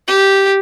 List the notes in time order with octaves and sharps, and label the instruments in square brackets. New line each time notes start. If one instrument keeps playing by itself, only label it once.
[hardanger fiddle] G4